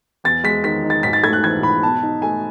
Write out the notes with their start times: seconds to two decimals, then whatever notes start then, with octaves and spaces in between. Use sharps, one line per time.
0.24 E2 A6
0.44 G#3 B6
0.64 D#3 B6
0.84 D#4
0.90 A6
1.03 G#2 B6
1.13 A6
1.24 A3 G#6
1.33 F#6
1.43 E3 G#6
1.63 G#2 B5
1.82 B2 A5
2.03 D#4
2.22 A3 G#5